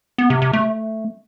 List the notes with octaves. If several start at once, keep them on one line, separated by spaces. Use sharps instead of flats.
B3
C3
C3
A3